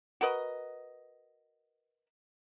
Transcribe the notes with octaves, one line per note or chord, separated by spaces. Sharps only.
F#4 A#4 B4 D#5